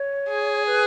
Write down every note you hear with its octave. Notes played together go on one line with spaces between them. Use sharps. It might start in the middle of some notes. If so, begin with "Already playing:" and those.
Already playing: C#5
G#4
B4